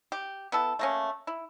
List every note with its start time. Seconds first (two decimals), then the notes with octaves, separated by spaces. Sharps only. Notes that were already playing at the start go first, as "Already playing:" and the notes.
0.12 G4
0.52 B3 E4 A4
0.79 A3 A#3 C#4
1.27 E4